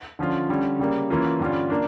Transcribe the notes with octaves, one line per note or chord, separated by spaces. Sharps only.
D3 F3 C#4 F4
D3 G3 C#4
C#3 G3 A#3
E3 A#3 C#4 F4
G2 D3 G3 C#4 F4
A#3 D4